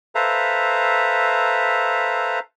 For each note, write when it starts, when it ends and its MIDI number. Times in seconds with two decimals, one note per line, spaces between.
0.15 2.39 69
0.15 2.39 71
0.15 2.39 72
0.15 2.39 76
0.15 2.39 77
0.15 2.39 82